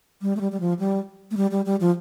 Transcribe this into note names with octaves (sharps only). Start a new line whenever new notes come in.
G3
A3
G3
G3
F3
G3
A3
G3
G3
G3
F3